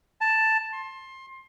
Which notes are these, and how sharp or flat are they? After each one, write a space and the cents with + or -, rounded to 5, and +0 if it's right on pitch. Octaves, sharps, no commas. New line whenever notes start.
A5 +5
C6 +25